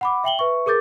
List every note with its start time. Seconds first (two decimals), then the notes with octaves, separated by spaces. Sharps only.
0.01 F#5 B5 D6
0.24 E5 G5 F#7 G7
0.39 B4 E5 C#6
0.66 G#4 A#4 D6 G6 A6